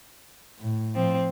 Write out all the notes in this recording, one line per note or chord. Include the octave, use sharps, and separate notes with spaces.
A2
F3 C4